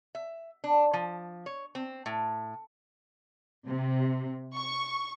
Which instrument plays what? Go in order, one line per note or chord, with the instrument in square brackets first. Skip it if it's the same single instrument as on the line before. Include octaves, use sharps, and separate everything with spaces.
[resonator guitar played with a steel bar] E5
D4
F3
C#5
C4
A2
[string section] C3
C#6